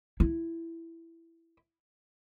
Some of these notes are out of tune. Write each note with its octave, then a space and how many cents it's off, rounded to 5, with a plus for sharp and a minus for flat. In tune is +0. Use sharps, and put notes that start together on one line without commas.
E4 +10